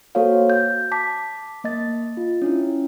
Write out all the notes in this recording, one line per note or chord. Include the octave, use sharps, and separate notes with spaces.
A#3 F#4 A4 C5 C#5 F5
G6
A5 D6 B6
A#3 D#5 A6
F4
C#4 D4 E4